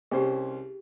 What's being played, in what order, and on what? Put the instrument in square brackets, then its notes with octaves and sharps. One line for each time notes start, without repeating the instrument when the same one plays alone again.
[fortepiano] C2 C#4 C5 [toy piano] G4 G#4